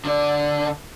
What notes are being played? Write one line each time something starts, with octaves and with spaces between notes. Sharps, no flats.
D3 D5